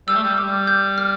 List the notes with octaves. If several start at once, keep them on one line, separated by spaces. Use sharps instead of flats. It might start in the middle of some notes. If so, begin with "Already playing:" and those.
G3 E6
A3
G3
G3 D6
G6
F6